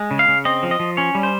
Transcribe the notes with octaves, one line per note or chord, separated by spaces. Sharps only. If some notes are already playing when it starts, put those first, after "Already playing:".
Already playing: G#3
C#3
F5
C#3
C4 D#5
F3
D#5
F3
C#4 C#5
G3
C5